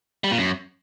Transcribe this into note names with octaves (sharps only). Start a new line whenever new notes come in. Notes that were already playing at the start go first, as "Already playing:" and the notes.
G3
A#2
F#2